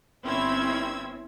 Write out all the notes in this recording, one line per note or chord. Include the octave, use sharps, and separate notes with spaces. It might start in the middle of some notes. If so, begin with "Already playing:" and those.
G1 C4 C#4 E4 E6 G#6